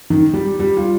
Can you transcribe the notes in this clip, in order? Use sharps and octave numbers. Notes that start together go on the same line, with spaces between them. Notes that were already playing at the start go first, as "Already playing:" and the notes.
D#3
G3
G3
F4